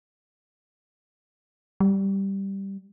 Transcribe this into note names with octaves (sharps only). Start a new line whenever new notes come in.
G3